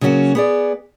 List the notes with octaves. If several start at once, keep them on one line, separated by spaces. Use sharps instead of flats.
C#3 F#3 A#3 C#4 F#4
B3 G#4 D5